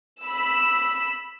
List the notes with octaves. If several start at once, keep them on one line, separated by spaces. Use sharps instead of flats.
B5 E6